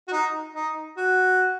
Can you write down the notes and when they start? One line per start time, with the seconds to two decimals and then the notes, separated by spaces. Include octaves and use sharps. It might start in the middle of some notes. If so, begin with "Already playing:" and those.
0.08 F#4
0.13 D#4
0.55 D#4
0.97 F#4